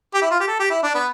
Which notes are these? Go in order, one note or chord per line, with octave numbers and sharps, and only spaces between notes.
G4
E4
F4
G4
A4
G4
E4
D4
B3